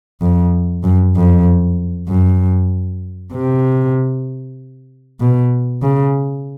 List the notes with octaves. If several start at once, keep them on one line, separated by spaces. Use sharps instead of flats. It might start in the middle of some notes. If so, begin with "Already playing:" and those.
F2
F#2
F2
F#2
C3
B2
C#3